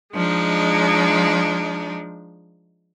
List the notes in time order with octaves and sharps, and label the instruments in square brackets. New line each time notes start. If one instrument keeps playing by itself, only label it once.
[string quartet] F3 G#3 D4 D#4